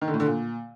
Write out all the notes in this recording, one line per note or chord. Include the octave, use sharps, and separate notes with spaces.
D#3
D3
A2
D3
A#2